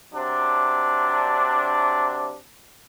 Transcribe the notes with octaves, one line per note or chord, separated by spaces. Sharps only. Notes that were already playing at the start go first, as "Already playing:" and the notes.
C3 F#3 D4